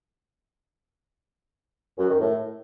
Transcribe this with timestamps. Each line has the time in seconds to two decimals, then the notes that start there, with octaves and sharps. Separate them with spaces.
1.98 F#2
2.09 D#3
2.20 A2